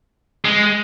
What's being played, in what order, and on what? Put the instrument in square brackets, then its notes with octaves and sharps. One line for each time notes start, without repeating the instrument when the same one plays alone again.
[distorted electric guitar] G#3